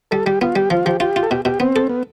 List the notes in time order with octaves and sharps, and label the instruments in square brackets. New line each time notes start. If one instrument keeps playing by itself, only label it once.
[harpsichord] G3 [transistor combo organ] A4
[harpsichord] G3 [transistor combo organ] G4
[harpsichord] B3 [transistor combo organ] F4
[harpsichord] G3 [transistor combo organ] G4
[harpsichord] F3 [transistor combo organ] F4
[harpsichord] F3 [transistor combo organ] G4
[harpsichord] F4 [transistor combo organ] G4
[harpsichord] F4
[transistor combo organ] A4
[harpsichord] B2 [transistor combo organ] G4
[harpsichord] B2 [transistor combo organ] G4
[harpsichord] B3 [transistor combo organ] C4
[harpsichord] A4
[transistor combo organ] B3